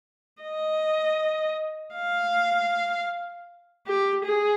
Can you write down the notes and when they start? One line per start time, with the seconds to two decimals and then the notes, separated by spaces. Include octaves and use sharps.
0.42 D#5
1.96 F5
3.87 G4
4.25 G#4